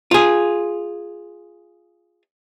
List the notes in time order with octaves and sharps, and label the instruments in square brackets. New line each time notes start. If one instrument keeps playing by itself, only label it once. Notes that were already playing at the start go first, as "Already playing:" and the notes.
[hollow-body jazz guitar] F4 G#4